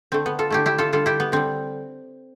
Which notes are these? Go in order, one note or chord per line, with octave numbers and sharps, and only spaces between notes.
D3 A3 C4
B3
F4 A4
D3 A3 E4 G4
E4 G4
F4 A4
D3 G3 F4 A4
E4 G4
B3
D3 G3 C4